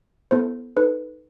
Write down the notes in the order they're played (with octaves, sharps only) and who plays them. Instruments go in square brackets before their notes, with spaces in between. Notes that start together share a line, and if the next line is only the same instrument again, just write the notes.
[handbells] B3 E4 A4 C5
D#4 A4 B4